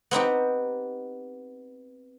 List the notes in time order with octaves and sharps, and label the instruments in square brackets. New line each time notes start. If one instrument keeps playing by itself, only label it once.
[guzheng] B3 C4 D#4 G4